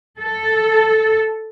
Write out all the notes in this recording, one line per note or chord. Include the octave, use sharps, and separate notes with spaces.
A4